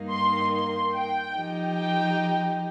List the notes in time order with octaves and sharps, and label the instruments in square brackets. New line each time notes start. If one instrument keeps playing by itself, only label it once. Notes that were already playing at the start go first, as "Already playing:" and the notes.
Already playing: [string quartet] G2 D#3 A#3 D#4
[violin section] C6
C6
G5
[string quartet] F3 D#4 G4
[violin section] G5